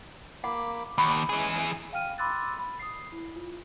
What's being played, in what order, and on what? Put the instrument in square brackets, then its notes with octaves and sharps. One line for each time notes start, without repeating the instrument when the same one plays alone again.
[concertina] A#3 B5 D6 [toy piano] F#5
[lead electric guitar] D#2 [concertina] F#5 [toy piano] B5 C#6
[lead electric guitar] E3 G#4 [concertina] G#3 C#4
[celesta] F5 G5 F6 D#7
B5 C6 D6 E6 F#6 A6
B5
D#6 C7
E4
F4